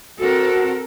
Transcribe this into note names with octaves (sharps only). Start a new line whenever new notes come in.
C4 F#4 A4 A#4